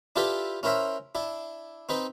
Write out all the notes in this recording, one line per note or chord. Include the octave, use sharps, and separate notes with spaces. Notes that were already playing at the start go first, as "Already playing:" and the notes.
D4 E4 F4 G4 A4 B4
C#4 E4 A#4 C5 E5
D4 E4
C4 D#4 B4